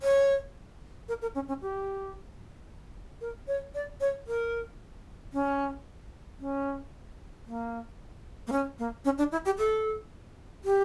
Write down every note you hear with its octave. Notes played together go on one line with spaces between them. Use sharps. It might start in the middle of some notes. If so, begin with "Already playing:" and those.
C#5
A#4
A#4
C#4
C#4
G4
A#4
C#5
D5
C#5
A#4
C#4
C#4
A#3
A#3
C#4
A#3
C#4
D4
E4
G4
A4
G4